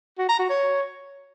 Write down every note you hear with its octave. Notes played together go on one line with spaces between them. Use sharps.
F#4
A#5
F#4
C#5